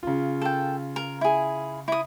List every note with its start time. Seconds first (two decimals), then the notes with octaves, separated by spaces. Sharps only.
0.03 C#3 F4
0.41 A4 G5
0.96 A#4
1.21 E4 G#4
1.88 E4 D#6